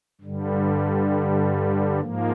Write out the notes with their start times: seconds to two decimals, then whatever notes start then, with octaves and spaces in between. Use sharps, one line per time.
0.21 G2 D3 G3
2.00 G#2 F3 A#3